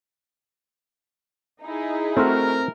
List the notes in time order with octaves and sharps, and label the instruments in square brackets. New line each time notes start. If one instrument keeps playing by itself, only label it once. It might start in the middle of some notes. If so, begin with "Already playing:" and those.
[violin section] D#4 E4 G#4
[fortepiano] A3 F#4 F6 [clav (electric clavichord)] C4 [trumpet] A#4